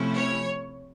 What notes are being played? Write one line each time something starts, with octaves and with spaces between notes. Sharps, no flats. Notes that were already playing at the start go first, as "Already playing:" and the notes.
Already playing: C3 F3 A3 C#4 E4
C#5